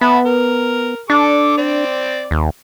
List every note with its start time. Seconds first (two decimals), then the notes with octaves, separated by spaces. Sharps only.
0.01 B3 E5 A5 B5
0.25 A#4
1.10 D4 A4 D6
1.57 C4 D5
2.31 D#2